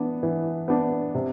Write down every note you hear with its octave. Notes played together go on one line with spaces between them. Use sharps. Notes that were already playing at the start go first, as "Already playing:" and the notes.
Already playing: E3 B3 D4
E3
B3 D4
C3